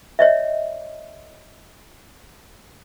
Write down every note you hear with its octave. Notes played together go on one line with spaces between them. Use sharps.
C#5 D#5 E5